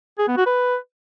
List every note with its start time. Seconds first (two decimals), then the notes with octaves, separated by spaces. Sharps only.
0.19 G#4
0.28 B3
0.37 F#4
0.46 B4